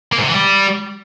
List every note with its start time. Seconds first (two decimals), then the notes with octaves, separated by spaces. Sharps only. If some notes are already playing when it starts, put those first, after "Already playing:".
0.13 A#3
0.18 G#2
0.23 C3
0.29 E3
0.34 G3